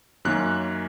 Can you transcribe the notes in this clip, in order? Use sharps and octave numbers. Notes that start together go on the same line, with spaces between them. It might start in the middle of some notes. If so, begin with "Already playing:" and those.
F#2 D#3 A#3 C#4 F#6